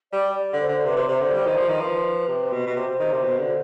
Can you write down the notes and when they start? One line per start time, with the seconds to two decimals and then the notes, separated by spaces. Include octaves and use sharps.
0.13 G3 D5
0.36 D5
0.53 D3
0.61 C5
0.69 D3
0.85 C3 B4
0.97 C3
1.01 D5
1.08 C3 C5
1.20 D3
1.33 G3
1.46 D#3
1.56 F3
1.69 D#3
1.80 F3 B4
2.28 C3
2.52 B2
2.67 B2
2.76 C3 C5
3.00 D#3
3.12 C3
3.24 B2
3.39 D3